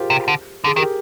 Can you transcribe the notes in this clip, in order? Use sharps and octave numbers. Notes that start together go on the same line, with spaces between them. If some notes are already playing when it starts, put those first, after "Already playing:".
Already playing: F4 G4 G#4 A#4 C5
C3
D3
D3 G#4
D#3 G4 A#4